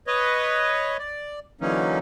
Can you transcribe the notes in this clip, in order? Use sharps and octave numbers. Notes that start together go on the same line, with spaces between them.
B4 C#5 D#5
D5
D3 E3 F#3 A#3 C#4 D#4